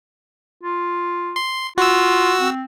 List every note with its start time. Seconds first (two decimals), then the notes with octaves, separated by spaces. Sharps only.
0.63 F4
1.36 C6
1.78 F4 F#4 E6
2.40 C4